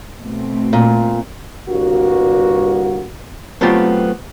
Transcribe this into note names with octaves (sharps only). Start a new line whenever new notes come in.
B2 A3 C4
A#2
G1 C2 G2 A#3 F#4
F#3 A3 B3 C4 F4 G4